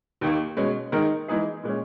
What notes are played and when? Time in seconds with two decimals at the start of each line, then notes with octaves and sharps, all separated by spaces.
0.21 D#2 D#3 A#3
0.57 B2 G#3 C#4
0.92 D#3 G#3 D#4 A#4
1.28 E3 G#3 D#4 G#4
1.63 A#2 G#3 C#4